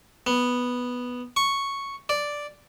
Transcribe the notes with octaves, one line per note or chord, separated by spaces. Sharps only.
B3
C#6
D5